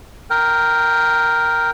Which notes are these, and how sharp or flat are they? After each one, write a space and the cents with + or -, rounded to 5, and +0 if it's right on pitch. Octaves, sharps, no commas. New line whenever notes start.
A#4 +0 G5 +0